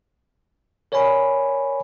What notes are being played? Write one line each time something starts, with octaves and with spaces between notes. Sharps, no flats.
A#4 C#5 D5 G#5 B5